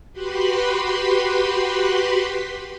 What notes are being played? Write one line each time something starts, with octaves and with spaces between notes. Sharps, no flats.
F#4 G4 B4 B5 C6